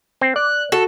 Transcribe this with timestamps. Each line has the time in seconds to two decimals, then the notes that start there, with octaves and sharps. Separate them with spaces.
0.21 C4
0.36 D5 F#6
0.72 F#4 A4